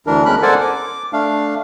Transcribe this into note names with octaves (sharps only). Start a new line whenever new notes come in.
D2 E3 D4 A#4
E2 G#3 C#4 A#4 B5 F#6
A4 A#4 C5 D5 F#5 G#5
D6
A3 D4 F5